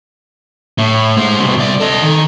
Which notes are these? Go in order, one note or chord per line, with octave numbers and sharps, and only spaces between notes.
A2
G#3 C5
C2 B2
C2 D5
A4 D#5
D#3